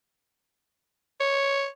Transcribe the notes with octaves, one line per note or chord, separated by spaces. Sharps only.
C#5